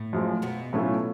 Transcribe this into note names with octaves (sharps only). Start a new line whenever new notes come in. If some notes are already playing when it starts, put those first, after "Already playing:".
Already playing: A2 A3
F#2 F3 G#3
B2 B3
A2 F#3 A3 C#4 F4